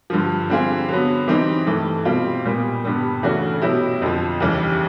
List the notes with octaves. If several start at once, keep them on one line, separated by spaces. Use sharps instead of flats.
G2 D3 F3
D3 G3 C4 F4 G#4
D3 F#3 B3
E3 G3 C4 D#4
G2 E3 A3
B2 G3 C4 F4
A#2 G3 B3
G2 D3 G3 B3
C#3 E3 A3 D4 F#4
B2 F#3 B3 E4 G4
F2 D3 F3
D#2 C#3 E3 G3